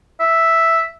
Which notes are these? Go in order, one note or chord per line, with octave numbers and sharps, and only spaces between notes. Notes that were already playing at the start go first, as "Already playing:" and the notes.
E5